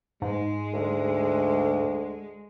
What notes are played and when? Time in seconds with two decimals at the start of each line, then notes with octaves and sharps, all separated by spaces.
0.22 G#2 G#3
0.74 D2